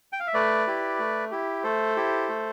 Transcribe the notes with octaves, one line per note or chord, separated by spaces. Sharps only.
G5
F5
E5
A3 B4 D5
E4 G4
A3
E4 G4
A3 A4 C5
E4 G4
A3